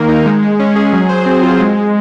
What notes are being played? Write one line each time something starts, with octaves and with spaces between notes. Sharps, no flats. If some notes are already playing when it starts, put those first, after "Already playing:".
Already playing: D#3 A#3 A#4
D#4
G#3
G#3
C#4
G#4
F#3
C5
C4
F4
G#3
G#3